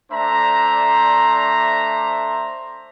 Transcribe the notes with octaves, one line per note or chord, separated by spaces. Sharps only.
A3 D4 C5 D5 E5 A#5